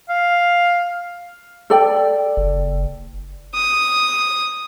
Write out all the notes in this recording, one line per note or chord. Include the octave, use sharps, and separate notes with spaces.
F5
A4 D5 G5
F#1
D#6